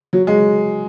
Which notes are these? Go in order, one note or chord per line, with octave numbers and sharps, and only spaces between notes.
F#3
G#3